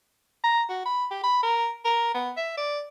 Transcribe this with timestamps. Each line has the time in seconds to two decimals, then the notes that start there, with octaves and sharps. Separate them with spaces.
0.44 A#5
0.69 F#4
0.86 B5
1.11 G4
1.23 B5
1.43 A#4
1.85 A#4
2.14 B3
2.37 E5
2.57 D5